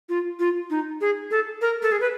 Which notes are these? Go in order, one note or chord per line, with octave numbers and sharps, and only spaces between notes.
F4
F4
D#4
G#4
A4
A#4
A4
G#4
B4